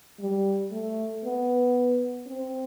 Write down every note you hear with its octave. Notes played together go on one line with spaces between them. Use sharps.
G3
A3
B3
C4